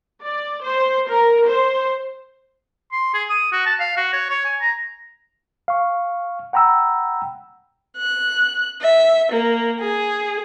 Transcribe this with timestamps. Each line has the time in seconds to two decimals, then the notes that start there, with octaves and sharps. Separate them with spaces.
0.23 D5
0.63 C5
1.10 A#4
1.47 C5
2.93 C6
3.14 G#4
3.30 D#6
3.52 F#4
3.66 A5
3.80 F5
3.97 F#4
4.13 C#5
4.30 C#5
4.45 G#5
4.61 A#5
5.68 F5 C#6
6.53 F#5 G5 A#5 B5 E6
7.96 F#6
8.81 E5
9.30 A#3
9.80 G#4